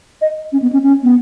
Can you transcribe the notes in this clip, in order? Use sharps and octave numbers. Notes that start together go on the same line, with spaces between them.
D#5
C#4
B3
C#4
C#4
B3